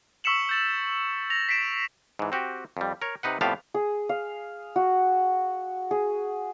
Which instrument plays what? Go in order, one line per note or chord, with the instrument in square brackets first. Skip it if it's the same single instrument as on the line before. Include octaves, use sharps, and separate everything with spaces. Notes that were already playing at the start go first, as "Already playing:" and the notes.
[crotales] C#6 E6 B6 C#7 E7 F#7
G6 A6 F#7
A#6 F7
B6 C7 D7 E7
[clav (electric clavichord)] G#2 E3
C4 F#4 G4
F2 G3
A#4 C#5
C3 D#4 B4 F#5
F2 A2 B3 G4 F5 A5
[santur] G#4
F5
F#4
G#4